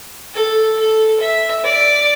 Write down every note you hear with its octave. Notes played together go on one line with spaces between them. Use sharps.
A4
A4
E5
D5